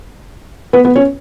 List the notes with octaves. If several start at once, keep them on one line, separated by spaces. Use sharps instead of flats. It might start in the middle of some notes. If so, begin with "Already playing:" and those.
B3 B4
B3 B4
C#4 C#5